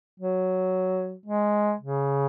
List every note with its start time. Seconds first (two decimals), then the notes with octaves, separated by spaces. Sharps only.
0.20 F#3
1.26 G#3
1.80 C#3